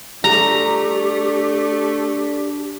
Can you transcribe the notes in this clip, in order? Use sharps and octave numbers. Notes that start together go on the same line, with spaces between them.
A3 D4 G4 A#5